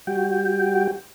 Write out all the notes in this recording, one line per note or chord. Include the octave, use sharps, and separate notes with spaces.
G3 F#4 G5